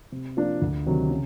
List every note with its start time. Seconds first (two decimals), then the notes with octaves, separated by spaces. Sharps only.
0.12 C3
0.37 F3 A#3 D4 F4
0.62 D2
0.86 C3 D#3 F#3
1.11 C#3